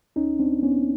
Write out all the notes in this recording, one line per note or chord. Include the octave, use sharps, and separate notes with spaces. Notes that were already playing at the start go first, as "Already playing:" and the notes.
C#2 C#4 D#4
C#2 C4 D4
C#2 B3 C#4